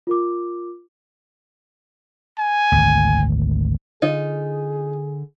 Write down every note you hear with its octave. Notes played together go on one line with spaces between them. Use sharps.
F4 A#4 D6
G#5
G#1 D2
D3 D#4 F4 G#4